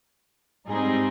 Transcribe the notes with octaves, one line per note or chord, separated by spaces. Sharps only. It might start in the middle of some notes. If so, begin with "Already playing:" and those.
G#2 G3 C4 D#4 G#4